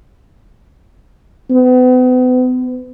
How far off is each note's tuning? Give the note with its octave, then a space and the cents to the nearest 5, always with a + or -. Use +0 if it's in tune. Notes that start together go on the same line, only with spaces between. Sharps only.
B3 +40